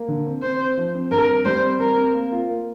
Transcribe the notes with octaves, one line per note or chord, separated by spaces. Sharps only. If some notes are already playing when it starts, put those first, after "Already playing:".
Already playing: A#3
D3
C4
C4 C5
C4
F3
C4
G2 A#4
C4
G3 C5
C4
C4 A#4
C4
A#3
F4
A#3